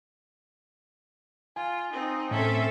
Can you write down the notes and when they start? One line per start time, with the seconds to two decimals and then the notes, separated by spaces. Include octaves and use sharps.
1.56 F4 G#5
1.93 C4 D#4
2.31 A2 C4 C#4 A4 E5